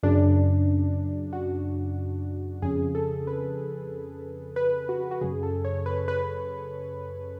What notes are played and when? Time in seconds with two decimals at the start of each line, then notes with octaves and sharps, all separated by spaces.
0.03 F#2 C#3 D4
1.33 F#4
2.62 F2 C#3 G#4
2.95 A4
3.27 B4
4.56 B4
4.89 F#4
5.11 F#4
5.21 F#2 C#3 G#4
5.43 A4
5.64 C#5
5.86 B4
6.08 B4